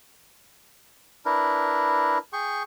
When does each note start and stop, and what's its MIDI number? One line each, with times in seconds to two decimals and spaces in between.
1.26 2.18 62
1.26 2.18 64
1.26 2.18 70
1.26 2.18 71
2.33 2.63 68
2.33 2.63 79
2.33 2.63 85